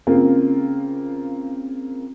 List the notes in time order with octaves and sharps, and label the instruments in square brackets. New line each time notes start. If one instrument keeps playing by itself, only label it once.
[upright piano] C#3 A#3 C4 F4